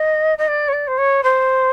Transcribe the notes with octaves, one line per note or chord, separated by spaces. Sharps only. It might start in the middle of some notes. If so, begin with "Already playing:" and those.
Already playing: D#5
D#5
D5
C#5
D5
C5
C#5
C5